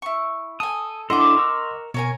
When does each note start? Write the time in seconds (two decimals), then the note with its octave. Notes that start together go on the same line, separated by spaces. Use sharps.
0.02 E4 C#6
0.60 A4 G#5 D#6
1.10 D4 E4 A4 D#5 F#5 C6 D6
1.37 A#4 C#6 E6
1.94 B2 C#4 A#4 G#5